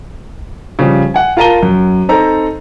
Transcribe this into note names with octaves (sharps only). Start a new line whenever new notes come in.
C#3 F3 G3
F#5 G#5
F4 A#4 A5 A#5 D#7 G7
F#2
C4 D#4 A4 C5 A#5